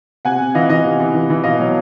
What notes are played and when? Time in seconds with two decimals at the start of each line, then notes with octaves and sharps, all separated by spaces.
0.25 C3 F#5 G#5
0.41 C3
0.55 E3 D#5 F5
0.70 E3 D#5
0.85 C3
1.00 E3
1.14 E3
1.30 E3
1.44 B2 D#5 F5
1.60 F#3